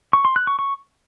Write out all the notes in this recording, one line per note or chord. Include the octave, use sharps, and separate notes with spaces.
C#6
C6
F#6
C#6
C#6